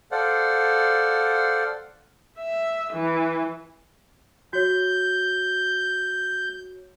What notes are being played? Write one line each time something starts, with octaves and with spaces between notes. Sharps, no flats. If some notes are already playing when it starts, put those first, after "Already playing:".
A4 C5 D5 F5 F#5
E5
E3
F#4 C#5 G6